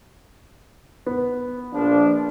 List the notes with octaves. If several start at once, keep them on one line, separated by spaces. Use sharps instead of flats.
B3
A#1 F3 D4